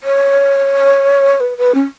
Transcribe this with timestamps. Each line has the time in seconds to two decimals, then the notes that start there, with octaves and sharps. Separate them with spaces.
0.03 C#5
1.40 B4
1.58 B4
1.75 C#4